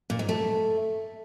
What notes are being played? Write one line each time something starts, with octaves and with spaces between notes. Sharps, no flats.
A#2
G#2
A3